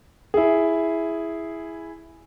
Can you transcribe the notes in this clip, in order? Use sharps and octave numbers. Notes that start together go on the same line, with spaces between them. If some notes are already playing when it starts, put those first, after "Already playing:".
E4 G#4